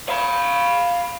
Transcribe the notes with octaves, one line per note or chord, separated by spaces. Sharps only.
F5 B5